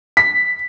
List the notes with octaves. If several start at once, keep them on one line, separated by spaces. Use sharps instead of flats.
B6